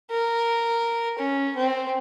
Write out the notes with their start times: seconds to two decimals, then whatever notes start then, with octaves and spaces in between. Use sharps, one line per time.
0.11 A#4
1.19 C#4
1.56 C4